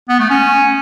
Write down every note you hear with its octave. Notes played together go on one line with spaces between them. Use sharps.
B3
A3
C#4